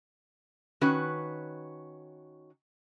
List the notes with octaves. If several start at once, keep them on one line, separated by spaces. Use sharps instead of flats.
D#3 C#4 F#4 B4